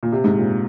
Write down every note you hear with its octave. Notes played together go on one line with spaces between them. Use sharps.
A#2
C3
G#2
A#2